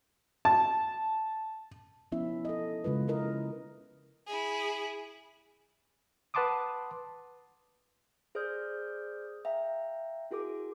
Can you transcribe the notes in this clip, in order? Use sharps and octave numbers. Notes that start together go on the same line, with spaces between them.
A5
F3 B3 C#4 E4 E5
A4 D#5
C#3 G#3 F4 B4
C#4 E4 A#4 D#5
E4 G#4
B4 F#5 A5 C6 D6 D#6
G#4 C5 D5 D#6 F6 G6
E5 F5 G5 A#5
E4 F#4 G#4 A#4 D6